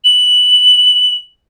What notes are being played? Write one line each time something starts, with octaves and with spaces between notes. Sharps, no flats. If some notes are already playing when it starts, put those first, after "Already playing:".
F#7